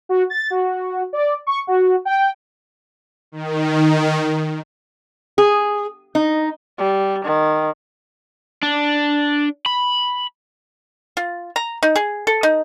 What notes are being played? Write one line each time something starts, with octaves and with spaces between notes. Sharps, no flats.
F#4
A6
F#4
D5
C#6
F#4
G5
D#3
G#4
D#4
G3
D#3
D4
B5
F4
A#5
D#4
G#4
A4
D#4